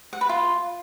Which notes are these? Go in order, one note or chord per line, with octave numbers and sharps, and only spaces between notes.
F#5
B4
F4